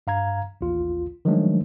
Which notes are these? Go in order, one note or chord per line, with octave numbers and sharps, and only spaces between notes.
G2 F5 A#5 G#6
A1 D#2 F4
D#3 F3 F#3 G#3 A3 D4